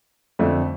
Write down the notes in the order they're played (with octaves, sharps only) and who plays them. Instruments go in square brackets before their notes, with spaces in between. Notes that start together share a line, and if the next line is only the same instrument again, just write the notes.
[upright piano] F2 D3 A3 D4